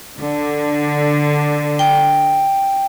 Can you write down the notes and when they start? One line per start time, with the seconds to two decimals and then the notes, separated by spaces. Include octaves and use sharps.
0.18 D3
1.79 G5